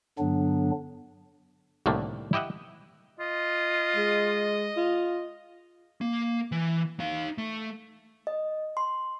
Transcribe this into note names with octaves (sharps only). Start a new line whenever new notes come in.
G2 D3 F#3 B3 D4
C2 A2 D3 D#3 A3 A#3
E4 G4 D#5 E5 F#5
F4 D#5
G#3
F4
A#3
E3
D#4 F5
A3
D#5
C6